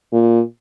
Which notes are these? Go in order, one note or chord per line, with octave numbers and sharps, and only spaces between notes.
A#2